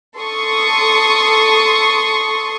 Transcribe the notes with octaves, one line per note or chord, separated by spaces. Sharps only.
A4 C6 C#6 D#6